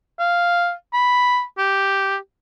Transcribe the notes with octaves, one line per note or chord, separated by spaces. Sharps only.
F5
B5
G4